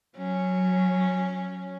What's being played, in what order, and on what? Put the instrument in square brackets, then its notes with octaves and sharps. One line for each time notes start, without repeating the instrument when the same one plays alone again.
[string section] F#3 [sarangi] C#4